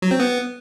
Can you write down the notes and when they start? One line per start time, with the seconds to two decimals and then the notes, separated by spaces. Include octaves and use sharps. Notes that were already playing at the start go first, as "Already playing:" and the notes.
0.02 F#3
0.11 C4
0.20 B3